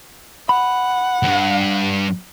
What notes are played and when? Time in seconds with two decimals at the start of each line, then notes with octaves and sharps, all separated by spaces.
0.49 F#5 B5
1.23 D2 G2